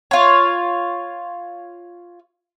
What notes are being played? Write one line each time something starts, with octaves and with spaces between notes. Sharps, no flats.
F4 C#5